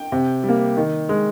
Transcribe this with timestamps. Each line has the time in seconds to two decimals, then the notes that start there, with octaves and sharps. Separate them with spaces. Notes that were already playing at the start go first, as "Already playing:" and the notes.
Already playing: G5
0.12 C3
0.43 G3
0.49 A#3
0.77 D#3
1.09 G#3